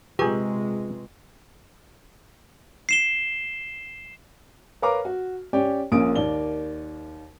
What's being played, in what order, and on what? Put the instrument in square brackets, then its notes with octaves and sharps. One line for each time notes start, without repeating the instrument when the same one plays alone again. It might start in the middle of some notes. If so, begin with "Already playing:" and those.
[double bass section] C3 G#3 [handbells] F4 B4 C#6 [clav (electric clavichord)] G4 G#4
[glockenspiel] C7 E7 G7
[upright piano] A#4 B4 C#5 F5 A#5 D6
F#4
C#4 G4 C#5 D5 G5
A#1 A#2 C#4 D#6 D7
D#2 A#3 D5 G7